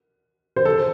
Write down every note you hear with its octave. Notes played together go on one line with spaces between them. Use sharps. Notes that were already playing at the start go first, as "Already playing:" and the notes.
C5
A4